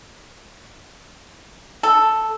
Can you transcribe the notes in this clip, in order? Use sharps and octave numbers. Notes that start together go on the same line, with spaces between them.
A4